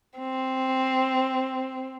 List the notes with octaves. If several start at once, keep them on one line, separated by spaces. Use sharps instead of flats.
C4